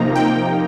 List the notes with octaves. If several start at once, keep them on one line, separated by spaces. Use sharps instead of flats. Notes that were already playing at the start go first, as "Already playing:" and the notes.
Already playing: C3 F3 A#3 D#4 A#5
G5